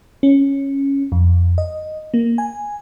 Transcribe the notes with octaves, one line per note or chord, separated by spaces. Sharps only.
C#4
F2
D#5
A#3
G#5